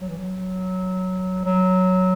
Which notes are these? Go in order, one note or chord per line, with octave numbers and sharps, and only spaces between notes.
F#3
E3
F#3
F#3